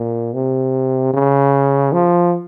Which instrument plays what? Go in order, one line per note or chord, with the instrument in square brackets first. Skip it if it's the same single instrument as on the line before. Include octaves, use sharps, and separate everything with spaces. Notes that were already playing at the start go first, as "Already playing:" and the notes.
Already playing: [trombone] A#2
C3
C#3
F3